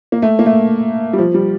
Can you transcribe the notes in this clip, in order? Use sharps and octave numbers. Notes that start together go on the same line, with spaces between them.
A#3
A3
A#3
A3
G3
F3
G3